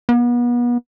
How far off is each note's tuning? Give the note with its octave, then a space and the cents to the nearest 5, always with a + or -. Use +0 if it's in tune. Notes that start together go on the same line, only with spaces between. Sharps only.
B3 -35